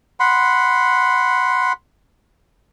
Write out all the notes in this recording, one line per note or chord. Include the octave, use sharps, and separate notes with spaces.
F#5 B5 C6